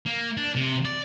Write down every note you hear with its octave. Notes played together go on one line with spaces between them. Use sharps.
A#3
D4
C3
D5